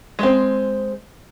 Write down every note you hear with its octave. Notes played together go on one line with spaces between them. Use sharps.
G#3 C4